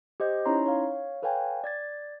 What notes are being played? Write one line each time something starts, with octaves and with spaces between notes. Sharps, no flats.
G4 C5 D#5 G6
C#4 D#4 E4 C#5 A#5 C6
C#5 F5
A4 B4 C#5 F5 G5 G#5
D5 G#6 A6